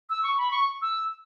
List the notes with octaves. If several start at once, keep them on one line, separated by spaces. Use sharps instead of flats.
E6
C#6
B5
C#6
E6